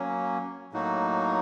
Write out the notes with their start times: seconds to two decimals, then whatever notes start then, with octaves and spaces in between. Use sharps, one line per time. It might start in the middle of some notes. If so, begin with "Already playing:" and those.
Already playing: F#3 A#3 C#4
0.73 A2 F#3 A#3 D#4 F#4